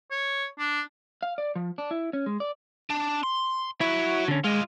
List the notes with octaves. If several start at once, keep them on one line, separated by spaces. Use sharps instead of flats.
C#5
D4
F5
D5
F3
D4
E4
C#4
G#3
D5
D4
C6
E4 F#4 C#5
D3 C#4
G#3 F4 D#5